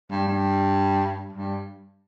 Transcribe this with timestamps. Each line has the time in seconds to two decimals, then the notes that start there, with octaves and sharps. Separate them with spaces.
0.11 G2
0.28 G2
1.33 G2